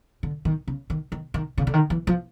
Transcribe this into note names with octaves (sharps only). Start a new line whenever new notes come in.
D3
D#3
C#3
D#3
D#3
D#3
C#3
D3
D#3
E3
F3